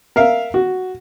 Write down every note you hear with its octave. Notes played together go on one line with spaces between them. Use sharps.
A#4 E5 F5
F#4